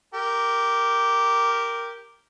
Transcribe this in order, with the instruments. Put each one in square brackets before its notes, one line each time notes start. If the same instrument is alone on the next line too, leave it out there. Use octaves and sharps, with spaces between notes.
[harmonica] G4 A#4